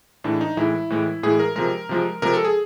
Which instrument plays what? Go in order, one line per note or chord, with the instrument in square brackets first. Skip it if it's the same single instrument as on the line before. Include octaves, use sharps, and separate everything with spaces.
[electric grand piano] A2 E3 G#3 D4
D#4
A2 E3 G#3 E4
A2 E3 G#3
A2 E3 G#3 G#4
A#4
C3 F3 G#3 A#4
C3 F3 G#3
C3 F3 G#3 A#4
A4
G#4